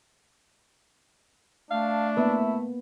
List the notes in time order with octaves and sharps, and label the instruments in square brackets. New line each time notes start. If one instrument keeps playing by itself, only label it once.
[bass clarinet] A3 [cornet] D4 [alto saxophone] F5
[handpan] A#3 B3 B4 [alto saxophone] E4